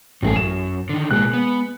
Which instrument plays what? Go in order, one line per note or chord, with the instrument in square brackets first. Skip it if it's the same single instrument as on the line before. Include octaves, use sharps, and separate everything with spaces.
[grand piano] A1 A3 [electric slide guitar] G2 F#4 G#4
[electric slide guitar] F#2 [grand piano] E7
[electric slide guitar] D3 D#3
[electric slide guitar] B2 A#3 [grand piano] G#3 F#6
[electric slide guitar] B3